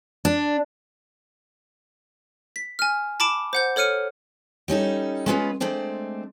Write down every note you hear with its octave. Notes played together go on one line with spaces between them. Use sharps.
D4
B6
G#5 F6
A5 B5 D6 D7 E7
C5 F#5 G6
A4 C#5 F6 C#7 D#7
G3 C#4 D#4 A4
G#3 B3 C#4 F4 A#4 B4
G#3 A3 C4 D4 C5